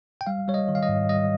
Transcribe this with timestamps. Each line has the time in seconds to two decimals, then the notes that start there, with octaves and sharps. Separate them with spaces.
0.21 G5
0.27 G3 F5
0.48 G3 C#5
0.54 D#5
0.68 D#3
0.75 F5
0.83 D#5
0.89 G#2
1.09 G3 D#5